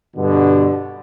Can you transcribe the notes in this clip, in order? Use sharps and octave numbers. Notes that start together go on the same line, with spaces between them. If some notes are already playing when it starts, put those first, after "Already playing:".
G2 B2 D3